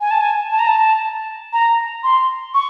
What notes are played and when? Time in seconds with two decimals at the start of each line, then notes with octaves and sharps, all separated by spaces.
0.01 G#5
0.11 A5
0.21 G#5
0.51 A5
0.59 A#5
0.67 A5
1.53 A#5
2.04 C6
2.54 C#6